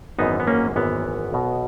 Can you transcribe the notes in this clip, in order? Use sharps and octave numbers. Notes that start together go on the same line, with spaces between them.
G#1 F#2 E3 B3 D#4
B3
A#3 C#4
G#1 F#2 E3 B3
B1 B2